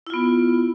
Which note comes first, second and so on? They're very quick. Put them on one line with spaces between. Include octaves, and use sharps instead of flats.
E4 F4 B3